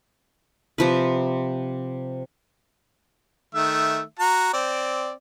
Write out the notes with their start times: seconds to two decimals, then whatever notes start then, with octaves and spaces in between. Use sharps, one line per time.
0.78 C3 F3 B4
3.55 D#3 A3 E5
4.19 F#4 A#5
4.53 C4 D5